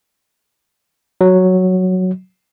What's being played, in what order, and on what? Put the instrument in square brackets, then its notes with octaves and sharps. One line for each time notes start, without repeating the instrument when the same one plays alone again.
[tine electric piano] F#3